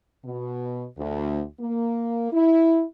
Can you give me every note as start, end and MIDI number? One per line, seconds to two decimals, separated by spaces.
0.25 0.84 47
0.97 1.42 38
1.59 2.31 58
2.32 2.83 64